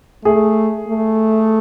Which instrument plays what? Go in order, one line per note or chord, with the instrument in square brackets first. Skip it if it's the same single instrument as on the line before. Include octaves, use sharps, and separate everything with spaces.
[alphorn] A3 [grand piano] G#4
[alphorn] A3